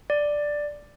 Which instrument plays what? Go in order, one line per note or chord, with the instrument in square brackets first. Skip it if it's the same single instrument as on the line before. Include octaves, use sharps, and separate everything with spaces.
[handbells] D5